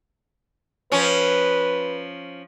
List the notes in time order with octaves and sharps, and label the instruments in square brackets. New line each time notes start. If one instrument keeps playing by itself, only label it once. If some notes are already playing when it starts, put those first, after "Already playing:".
[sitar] F3 C#4 [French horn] B4